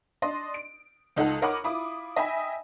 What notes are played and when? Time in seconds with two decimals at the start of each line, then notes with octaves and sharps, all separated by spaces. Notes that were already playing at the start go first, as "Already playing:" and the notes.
0.22 D4 D5 D#5 C6
0.54 D7
1.16 C#2 D#4 A4 F#5
1.42 A#4 C#5 D#5 F#5 B5 D6
1.64 E4 F4 B5 D6 D#6
2.16 D#5 E5 G5 G#5 B5